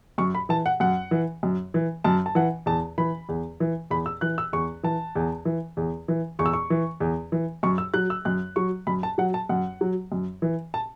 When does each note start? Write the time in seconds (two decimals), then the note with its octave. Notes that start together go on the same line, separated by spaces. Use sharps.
0.18 F#2 C#6
0.35 B5
0.49 E3 A5
0.66 F#5
0.80 F#2 F#5
1.11 E3
1.43 F#2
1.74 E3
2.04 F#2 A5
2.26 A5
2.35 E3 F#5
2.66 E2 A5
2.98 E3 B5
3.29 E2
3.60 E3
3.90 E2 B5
4.06 E6
4.21 E3 F#6
4.38 E6
4.53 E2 C#6
4.83 E3 A5
5.16 E2
5.45 E3
5.77 E2
6.08 E3
6.39 E2 C#6
6.46 E6
6.53 C#6
6.70 E3
7.00 E2
7.32 E3
7.63 F#2 C#6
7.78 E6
7.94 F#3 F#6
8.10 E6
8.25 F#2 F#6
8.56 F#3 C#6
8.87 F#2 B5
9.03 A5
9.18 F#3 F#5
9.34 A5
9.49 F#2 F#5
9.81 F#3
10.12 F#2
10.42 E3
10.74 A5